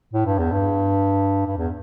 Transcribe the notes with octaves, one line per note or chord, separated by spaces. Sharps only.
A2
G2
E2
G2
G2
E2